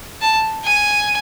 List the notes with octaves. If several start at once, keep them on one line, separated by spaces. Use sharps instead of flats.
A5
G#5